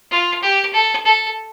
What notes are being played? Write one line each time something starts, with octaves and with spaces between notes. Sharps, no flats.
F4
G4
A4
A4